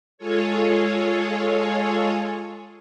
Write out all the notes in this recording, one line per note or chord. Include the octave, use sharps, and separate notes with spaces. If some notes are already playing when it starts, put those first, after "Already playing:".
G#3 F4 G#4 A4 C#5